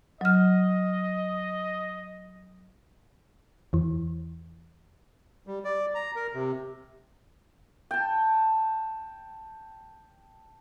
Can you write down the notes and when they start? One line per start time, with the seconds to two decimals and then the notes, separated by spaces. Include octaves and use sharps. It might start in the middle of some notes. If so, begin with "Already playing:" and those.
0.21 F#3 D#5 F6
3.73 E2 E3
5.47 G3
5.65 D5
5.95 A#5
6.16 A#4
6.34 C3
7.91 G5 A5